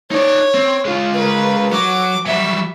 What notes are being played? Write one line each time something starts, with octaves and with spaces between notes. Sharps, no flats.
D#4 C#5 D5
C4
G#3 F4
A#4 B4
F#3 F#4 D6
F#3 G3 E5